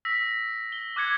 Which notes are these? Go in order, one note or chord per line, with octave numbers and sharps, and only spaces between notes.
E6 A#6 B6
G7
D6 F#6 G#6 C#7